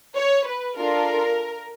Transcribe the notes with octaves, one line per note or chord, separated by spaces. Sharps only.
C#5
B4
D4 F4 A4 A#4